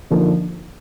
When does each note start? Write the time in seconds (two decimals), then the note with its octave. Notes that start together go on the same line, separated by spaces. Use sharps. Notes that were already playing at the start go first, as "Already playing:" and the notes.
0.11 D3 F3 A#3 D#4